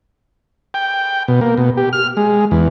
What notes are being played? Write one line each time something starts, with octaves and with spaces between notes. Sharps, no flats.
G5
B2
A#3
B2
G4
F6
G#3
E2